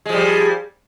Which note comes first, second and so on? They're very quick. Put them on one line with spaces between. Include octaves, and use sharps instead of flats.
G#3 F3 G3